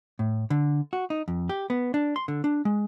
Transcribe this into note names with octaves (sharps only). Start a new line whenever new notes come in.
A2
D3
F#4
D#4
F2
G4
B3
D4
C6
D3
D4
G#3